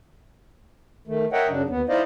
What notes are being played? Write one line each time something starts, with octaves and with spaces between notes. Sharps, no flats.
D#3 A3
A#4 C#5 D#5 E5 F#5 G5
F#2 C#3 F#3 D4
D#2 B3
D#4 E4 C5 D5 D#5 F5